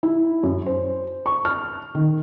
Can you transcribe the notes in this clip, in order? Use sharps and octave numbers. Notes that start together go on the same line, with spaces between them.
E4
F#2
C5
C#6
F6
D#3